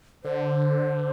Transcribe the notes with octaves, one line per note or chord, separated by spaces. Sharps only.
D3 C5